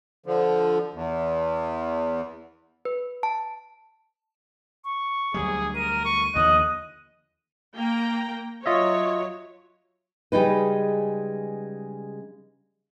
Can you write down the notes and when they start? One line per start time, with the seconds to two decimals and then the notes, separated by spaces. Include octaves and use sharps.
0.26 D3 F3
0.94 E2
2.85 B4
3.23 A5
4.84 C#6
5.34 D2 F#3 G3 G#4
5.75 A#4 D#7
6.05 C#6
6.36 D#2 D3 F3 D#5 F#6
7.75 A#3 G5 A#5
8.66 F#3 F4 C#5 D#5 E5
10.32 C#3 G3 G#3 D#4 B4